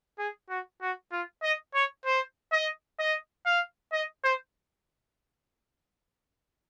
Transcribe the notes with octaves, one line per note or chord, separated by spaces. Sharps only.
G#4
F#4
F#4
F4
D#5
C#5
C5
D#5
D#5
F5
D#5
C5